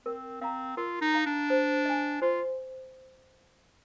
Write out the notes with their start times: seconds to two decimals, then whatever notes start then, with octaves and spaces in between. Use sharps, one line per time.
0.06 C4 A#4
0.41 C4 F5 A#5
0.77 F4 A#4
1.01 D#4
1.14 F5 A#5
1.26 D4
1.50 C5
1.85 D#5 G#5
2.22 F4 C5